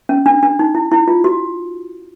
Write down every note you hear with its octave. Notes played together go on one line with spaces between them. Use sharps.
C#4
D4
D4
D#4
E4
E4
F4
F#4